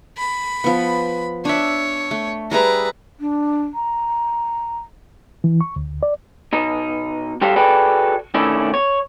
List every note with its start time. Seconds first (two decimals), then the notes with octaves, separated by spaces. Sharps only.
0.17 B5
0.64 F3 B3
1.45 D4 C#5 E5
2.11 A3
2.51 G3 G#4 B4 E5 A#5
3.20 D4
3.74 A#5
5.44 E3
5.61 C#6
5.76 D2
6.03 D5
6.53 B2 D#4
7.41 G3 F#4 G4 A4 C5 F5
7.56 F#4 G#4 A4 B4 D5 G5
8.34 B2 D#3 A3 C#4 D4 E4
8.74 C#5